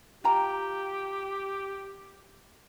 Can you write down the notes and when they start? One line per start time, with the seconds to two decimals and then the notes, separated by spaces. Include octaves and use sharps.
0.24 F4 G4 G5 A#5